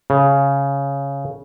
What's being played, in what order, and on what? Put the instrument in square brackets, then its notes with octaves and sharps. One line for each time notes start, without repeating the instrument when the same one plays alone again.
[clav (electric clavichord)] C#3